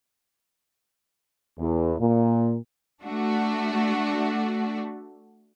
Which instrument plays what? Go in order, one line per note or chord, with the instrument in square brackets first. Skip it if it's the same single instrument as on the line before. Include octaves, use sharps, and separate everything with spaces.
[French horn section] E2
A#2
[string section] A3 D4 F#4